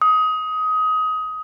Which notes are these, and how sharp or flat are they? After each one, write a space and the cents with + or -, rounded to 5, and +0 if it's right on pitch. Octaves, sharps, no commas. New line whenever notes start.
D#6 +20